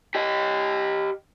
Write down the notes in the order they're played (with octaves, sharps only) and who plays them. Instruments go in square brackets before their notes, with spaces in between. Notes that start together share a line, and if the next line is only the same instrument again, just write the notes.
[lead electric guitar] G4 D#5